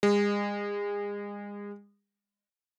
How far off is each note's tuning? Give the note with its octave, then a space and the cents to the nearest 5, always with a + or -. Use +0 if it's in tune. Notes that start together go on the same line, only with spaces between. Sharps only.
G#3 -35